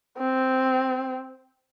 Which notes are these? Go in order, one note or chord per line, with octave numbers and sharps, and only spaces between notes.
C4